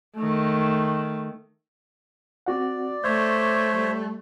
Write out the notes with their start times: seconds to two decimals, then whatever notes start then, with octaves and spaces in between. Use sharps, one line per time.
0.16 D#3 A3
2.46 C4 F#4 D5 F#5
3.04 A3 C5 C#5 E5 G6 G#6
3.74 G3